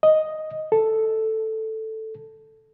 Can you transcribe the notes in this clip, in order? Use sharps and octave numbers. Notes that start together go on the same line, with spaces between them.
D#5
A4